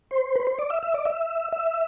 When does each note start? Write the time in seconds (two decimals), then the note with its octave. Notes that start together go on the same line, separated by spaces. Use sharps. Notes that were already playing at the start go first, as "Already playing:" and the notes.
0.11 C5
0.35 B4
0.47 C5
0.59 D5
0.70 E5
0.83 E5
0.94 D5
1.05 E5
1.52 E5